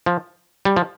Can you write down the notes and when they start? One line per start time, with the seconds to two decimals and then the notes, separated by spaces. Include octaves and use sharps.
0.06 F3
0.65 G3
0.76 F3